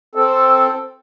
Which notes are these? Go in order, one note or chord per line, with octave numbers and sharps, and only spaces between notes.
C4 A4